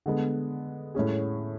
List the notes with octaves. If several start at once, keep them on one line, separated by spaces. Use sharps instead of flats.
D3 G#3 B3
A2 G#3 C#4 G#4